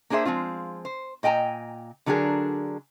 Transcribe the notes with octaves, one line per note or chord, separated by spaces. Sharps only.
A#3 D4 G#4 C5 E5
F3 G#3 C4 F4
C5
A#2 D#5 G5 G#5 A#5
D3 F#3 D4 F#4 G#4 A#4